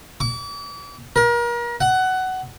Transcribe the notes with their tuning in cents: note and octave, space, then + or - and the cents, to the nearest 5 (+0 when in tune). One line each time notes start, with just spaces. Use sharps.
D6 -40
A#4 +35
F#5 +15